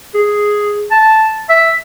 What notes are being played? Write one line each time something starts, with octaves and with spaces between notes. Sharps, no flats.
G#4
A5
E5